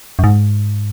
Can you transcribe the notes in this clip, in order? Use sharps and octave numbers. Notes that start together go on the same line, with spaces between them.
F#2
G#2